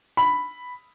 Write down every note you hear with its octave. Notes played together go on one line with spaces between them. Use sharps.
B5